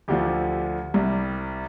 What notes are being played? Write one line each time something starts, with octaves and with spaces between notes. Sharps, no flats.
D2 D3 F3 G4
C2 C3 G3